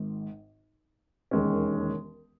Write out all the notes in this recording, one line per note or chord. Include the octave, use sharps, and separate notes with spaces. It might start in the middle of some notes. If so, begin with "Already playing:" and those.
Already playing: G#1 G#2
E1 D#2 D#3 G#3 C#4